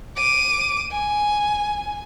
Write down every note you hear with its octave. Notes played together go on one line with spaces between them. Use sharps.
D6 D#7
G#5